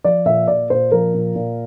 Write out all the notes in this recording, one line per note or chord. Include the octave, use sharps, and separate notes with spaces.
F3 D5
A#2 E5
A#2 D5
A#2 C5
F3 A#4
A#2
A#2